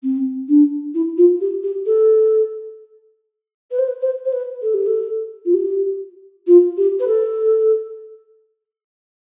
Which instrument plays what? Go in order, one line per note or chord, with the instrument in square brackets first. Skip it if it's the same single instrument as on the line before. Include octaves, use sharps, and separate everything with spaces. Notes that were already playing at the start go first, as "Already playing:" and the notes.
[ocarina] C4
D4
E4
F4
G4
G4
A4
B4
C5
B4
C5
C5
B4
A4
G4
A4
F4
G4
F4
G4
B4
A4